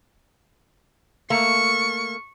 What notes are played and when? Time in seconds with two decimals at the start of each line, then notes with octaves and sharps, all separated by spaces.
1.30 A3 A#3 C#6